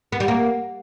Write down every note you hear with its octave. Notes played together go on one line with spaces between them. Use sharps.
B3
G3
A#3